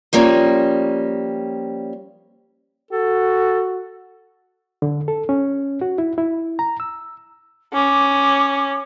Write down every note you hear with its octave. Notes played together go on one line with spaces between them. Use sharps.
F3 G3 A#3 C#4
F#4 A4
D3
A4
C#4
F#4
E4
E4
A#5
E6
C#4 D6